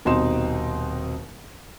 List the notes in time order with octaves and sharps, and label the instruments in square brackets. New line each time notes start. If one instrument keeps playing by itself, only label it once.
[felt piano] D#1 B2 C4 D#4 C6 E7